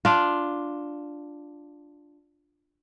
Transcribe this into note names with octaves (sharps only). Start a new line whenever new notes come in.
D4 F4